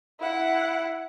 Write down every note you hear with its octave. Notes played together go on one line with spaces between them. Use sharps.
E4 F#5